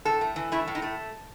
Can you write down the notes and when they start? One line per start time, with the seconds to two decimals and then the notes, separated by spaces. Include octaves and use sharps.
0.05 A2 A4
0.21 A3
0.36 E3
0.52 A3 E4
0.67 A2
0.75 D#4
0.82 A3